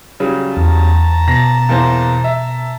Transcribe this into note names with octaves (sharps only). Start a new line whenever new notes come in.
C#3 F#3 G3
E2 A5 A#5
B2 A#6
E2 A#3 C5
E5